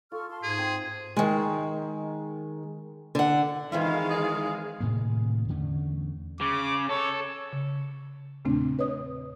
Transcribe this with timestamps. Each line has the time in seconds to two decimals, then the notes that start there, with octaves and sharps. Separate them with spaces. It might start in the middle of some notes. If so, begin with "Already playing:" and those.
0.12 F4 A4 C#6 F6
0.30 A5 C6
0.43 G#2 G#4
0.58 C4
1.17 D#3 G#3
3.15 D3 F#5
3.72 D#3 E3 G#3 C4 F4 E5 F5
4.09 G#4
4.81 A2 C3 D#3 A#3
5.48 E2 D3 A3 C#4
6.41 C#3 D6
6.89 A4 C#5
7.53 C#3
8.45 E2 A#2 C#3 A3 C4 D4
8.79 B4 C#5 D#5 D#6